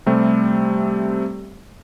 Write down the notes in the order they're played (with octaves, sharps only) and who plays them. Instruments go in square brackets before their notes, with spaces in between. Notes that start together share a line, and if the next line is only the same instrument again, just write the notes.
[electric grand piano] C3 G3 A3 C4